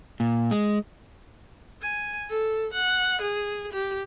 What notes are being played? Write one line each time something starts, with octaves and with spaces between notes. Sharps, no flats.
A#2
G#3
G#5
A4
F#5
G#4
G4